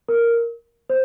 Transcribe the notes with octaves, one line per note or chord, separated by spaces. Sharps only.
A#4
C5